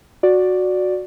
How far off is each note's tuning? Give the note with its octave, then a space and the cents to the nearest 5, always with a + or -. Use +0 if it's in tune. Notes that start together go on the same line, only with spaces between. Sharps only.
F#4 -10 D5 +0